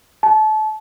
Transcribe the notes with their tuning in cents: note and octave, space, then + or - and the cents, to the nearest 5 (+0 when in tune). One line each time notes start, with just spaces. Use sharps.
A5 -30